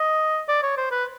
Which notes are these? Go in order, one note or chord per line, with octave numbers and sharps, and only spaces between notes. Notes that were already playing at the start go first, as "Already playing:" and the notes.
Already playing: D#5
D5
C#5
C5
B4